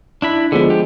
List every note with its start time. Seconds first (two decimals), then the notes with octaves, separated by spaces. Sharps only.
0.22 D4 E4 B5
0.52 D3 F3 G#3 B3
0.70 G4